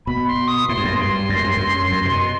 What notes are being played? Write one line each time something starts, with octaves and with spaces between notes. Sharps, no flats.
B2 B5
C6
D#6
A2 C6
G2
F#2
G2
C6
F#2
G2
F#2
F#2
C3
B2